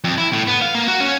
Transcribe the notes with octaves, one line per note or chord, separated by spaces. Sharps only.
F2
E4
A2
B3
F5
A#3
F#4
C#4